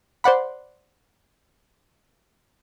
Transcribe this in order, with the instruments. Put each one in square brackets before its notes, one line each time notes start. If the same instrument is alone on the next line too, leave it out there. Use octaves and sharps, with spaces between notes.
[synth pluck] C5 D5 F#5 B5